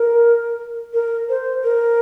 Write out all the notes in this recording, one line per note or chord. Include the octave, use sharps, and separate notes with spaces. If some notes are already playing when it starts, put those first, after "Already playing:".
Already playing: A#4
A#4
C5
A#4